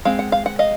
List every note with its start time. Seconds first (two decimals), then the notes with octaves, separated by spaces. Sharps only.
0.05 G#3 C4 F5
0.19 F#5
0.32 F5
0.46 F#5
0.59 D#5 F5